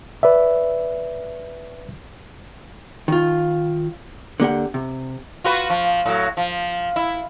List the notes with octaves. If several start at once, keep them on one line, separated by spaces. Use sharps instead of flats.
B4 D5 E5
D#3 F4
D3 A#3 G4 F#5
C3
F4 F#4 B4
F3
A2 F#3
F3
E4